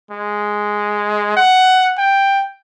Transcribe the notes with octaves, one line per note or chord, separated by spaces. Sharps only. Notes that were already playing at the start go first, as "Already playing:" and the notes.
G#3
F#5
G5